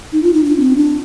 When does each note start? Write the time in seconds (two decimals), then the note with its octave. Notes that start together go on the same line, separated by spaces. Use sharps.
0.12 D#4
0.23 F4
0.34 D#4
0.44 D4
0.60 C4
0.76 D4